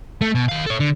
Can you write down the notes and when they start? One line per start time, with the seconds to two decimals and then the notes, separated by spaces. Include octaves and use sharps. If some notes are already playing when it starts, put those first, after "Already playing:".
0.21 A3
0.35 B2
0.49 D#3 F5
0.66 A4 C#5
0.80 D3